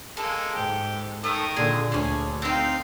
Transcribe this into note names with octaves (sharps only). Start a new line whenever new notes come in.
G#3 A#3 A4
G#2 G4
D#3 A3 A4 D#6
A#2 D3 G#4
D2 C#4 D4 G#4
C4 D#4 F5 G5